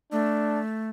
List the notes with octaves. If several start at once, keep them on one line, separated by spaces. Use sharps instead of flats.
A3 D4